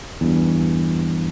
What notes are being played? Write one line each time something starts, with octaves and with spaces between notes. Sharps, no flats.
E2 G2